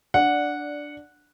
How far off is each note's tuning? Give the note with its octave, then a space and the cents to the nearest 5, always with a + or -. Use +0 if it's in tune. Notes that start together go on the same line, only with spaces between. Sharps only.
D4 +0 D5 -10 F#5 -10